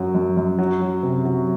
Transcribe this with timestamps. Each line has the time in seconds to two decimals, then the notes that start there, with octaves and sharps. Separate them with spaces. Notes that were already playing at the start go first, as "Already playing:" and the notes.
Already playing: F#2 F#3 F#4
0.15 F#2
0.37 F#2
0.59 F#3
0.81 F#3
1.03 C3
1.25 F#3